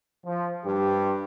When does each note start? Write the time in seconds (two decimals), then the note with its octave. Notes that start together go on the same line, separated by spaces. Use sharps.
0.25 F3
0.65 G2 G3 G4